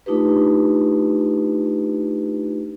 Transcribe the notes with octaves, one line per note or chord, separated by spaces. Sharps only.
A3 D4 D#4 F4 G4 B4